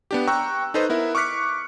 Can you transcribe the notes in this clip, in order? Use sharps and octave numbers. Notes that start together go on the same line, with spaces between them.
B3 D4 G4
G5 A#5 C#6 E6 F#6
D#4 A4 B4 C5 D#5
B3 E4 A#4 E5
C#6 D6 F6 F#6 B6 C#7